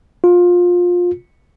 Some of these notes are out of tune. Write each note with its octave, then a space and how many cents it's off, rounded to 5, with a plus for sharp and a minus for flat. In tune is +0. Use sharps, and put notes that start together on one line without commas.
F4 +20